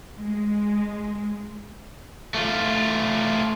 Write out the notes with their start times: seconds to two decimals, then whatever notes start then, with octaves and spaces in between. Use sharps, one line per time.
0.17 G#3
2.34 A3 F4